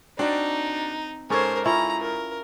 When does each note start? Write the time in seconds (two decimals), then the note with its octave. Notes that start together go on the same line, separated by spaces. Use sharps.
0.19 C4 D4 D#4 F#4 D5
1.30 G#2 C#4 A4 A#4 C5 C#6 G#6
1.65 C#4 E4 F4 A#5
2.01 A#4